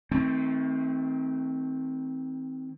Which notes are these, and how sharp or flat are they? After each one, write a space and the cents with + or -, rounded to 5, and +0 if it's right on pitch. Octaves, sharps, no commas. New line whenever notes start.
D#3 +40 A3 +0 C4 +0